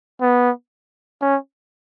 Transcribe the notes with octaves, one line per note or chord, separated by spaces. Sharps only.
B3
C#4